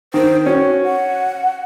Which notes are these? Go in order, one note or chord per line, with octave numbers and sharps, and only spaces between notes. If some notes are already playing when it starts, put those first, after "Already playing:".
D#3 C5
C#4 F#4
F#5